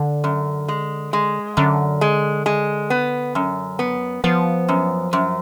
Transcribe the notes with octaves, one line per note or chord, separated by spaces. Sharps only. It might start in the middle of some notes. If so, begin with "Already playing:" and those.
Already playing: D3
F#2
G#3
G#3
F#2 D3
G#3
G#3
B3
F#2
B3
F3 B3
F#2
F#2